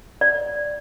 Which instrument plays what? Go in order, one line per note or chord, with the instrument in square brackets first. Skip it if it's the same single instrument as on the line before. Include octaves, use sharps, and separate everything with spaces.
[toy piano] D5